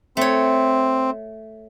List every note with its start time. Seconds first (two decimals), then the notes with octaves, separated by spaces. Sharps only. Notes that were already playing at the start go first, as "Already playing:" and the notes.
0.17 A3 C4 C#5